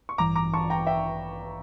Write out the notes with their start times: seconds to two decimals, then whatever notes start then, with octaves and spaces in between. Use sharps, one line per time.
0.09 C#6
0.18 A1 G2 E3 A#5 D6
0.35 A#5 D6
0.54 A5 C#6
0.70 G5 A#5
0.87 E5 G5